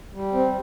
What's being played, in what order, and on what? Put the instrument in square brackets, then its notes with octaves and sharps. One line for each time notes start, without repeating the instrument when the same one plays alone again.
[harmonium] G3
C4